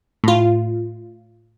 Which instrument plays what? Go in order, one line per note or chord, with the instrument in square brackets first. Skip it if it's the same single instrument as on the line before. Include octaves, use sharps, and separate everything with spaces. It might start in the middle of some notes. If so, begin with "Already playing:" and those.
[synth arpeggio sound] A2 F4